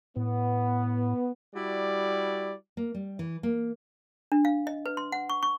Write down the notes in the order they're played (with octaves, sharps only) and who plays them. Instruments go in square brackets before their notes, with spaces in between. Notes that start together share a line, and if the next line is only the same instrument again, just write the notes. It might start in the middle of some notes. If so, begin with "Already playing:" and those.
[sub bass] A2 [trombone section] B3
[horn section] G3 E4 F#4 D5
[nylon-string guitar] A#3
G3
E3
A#3
[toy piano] D4
F5
D#5
B4
C6
F#5
C#6
C#6